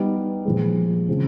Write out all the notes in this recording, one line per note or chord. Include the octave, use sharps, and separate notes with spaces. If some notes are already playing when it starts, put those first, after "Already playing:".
Already playing: G3 B3 D#4
A#2 F3 G#3
C#3 F3 G#3 C4